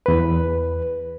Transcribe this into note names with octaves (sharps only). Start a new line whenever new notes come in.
E2 B4